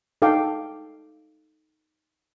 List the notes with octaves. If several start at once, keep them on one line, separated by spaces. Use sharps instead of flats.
D#4 A4 F5 G5 D6